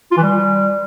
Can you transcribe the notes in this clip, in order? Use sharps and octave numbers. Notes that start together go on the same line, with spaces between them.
F4
E3
G3